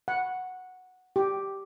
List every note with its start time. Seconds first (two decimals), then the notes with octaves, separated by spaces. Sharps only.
0.08 F#5
1.16 G4